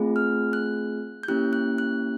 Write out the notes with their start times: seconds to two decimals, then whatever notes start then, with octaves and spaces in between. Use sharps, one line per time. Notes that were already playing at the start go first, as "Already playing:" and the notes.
Already playing: A3 C4 F4 G#4
0.16 F6
0.53 F#6
1.23 G6
1.28 A#3 C#4 E4 G4 F#6
1.53 F#6
1.78 F#6